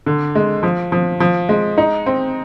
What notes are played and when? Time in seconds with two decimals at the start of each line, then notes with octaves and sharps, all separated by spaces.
0.06 D3
0.35 G#3
0.63 F3
0.92 F3
1.20 F3
1.49 G#3
1.78 D#4
2.06 C4